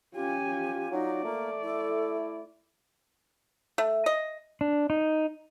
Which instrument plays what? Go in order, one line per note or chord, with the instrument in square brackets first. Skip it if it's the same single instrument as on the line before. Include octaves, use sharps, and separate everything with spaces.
[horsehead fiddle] C#4 G#5 [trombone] F4 [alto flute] G4
[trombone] F4
[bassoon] F#3 [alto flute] D#4 [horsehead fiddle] D5
[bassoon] A3 [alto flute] A#3
[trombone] E4 [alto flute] A4
[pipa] A3
D#5
[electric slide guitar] D4
D#4